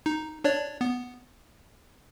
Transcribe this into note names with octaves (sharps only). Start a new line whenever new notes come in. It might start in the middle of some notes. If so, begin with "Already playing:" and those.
D#4
D4 C#5 D5
B3